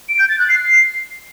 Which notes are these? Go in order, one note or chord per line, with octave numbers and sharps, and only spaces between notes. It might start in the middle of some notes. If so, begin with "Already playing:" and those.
D7
G6
A6
F#6
C7